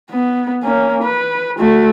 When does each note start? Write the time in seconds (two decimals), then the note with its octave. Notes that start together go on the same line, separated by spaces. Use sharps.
0.10 B3
0.63 A#3 C#4
1.03 B4
1.59 A3 F#4